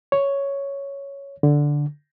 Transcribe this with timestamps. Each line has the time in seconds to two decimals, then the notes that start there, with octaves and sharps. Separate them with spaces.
0.12 C#5
1.43 D3